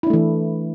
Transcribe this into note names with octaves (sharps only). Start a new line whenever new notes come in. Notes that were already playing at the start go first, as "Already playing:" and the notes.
E3 A3 D4 E4